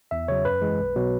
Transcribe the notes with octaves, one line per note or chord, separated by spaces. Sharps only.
E2 E5
C#3 F#3 C#5
F#2 B4
E3 G#3
B1
B2 F#3